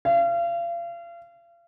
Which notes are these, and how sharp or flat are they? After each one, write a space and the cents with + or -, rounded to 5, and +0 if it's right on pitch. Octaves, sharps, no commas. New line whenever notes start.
F5 -35